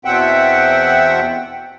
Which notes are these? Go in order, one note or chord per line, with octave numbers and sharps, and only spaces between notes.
E2 B2 C4 E5 F#5 G5